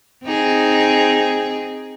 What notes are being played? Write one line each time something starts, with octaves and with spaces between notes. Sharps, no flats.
C4 D#4 G#4